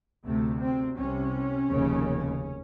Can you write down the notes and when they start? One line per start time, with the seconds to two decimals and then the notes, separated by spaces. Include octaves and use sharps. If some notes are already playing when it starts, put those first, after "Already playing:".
0.26 D2 C3 A3
0.62 C4
0.99 C2 C3 C#4
1.70 F1 D#2 C#3